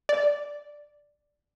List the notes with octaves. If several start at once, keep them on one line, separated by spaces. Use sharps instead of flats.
D5